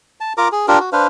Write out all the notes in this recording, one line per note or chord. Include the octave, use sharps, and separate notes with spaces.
A5
F4 A#4 A#5 D6
G#4
D4 F4 G4 A#4
F#4
D4 B4 C5 F5